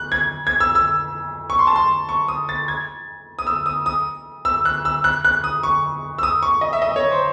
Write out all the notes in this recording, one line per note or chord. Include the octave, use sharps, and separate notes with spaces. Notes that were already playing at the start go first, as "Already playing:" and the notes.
Already playing: F#6
G#6
G#6
E6
E6
C#6
C6
A5
C6
C#6
D#6
A6
G#6
D#6
E6
D#6
D#6
E6
F#6
E6
F#6
F#6
D#6
C#6
E6
D#6
C#6
D#5
E5
D#5
C#5
C5